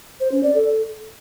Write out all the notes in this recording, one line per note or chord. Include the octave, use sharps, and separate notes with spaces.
C5
C#4
D5
A4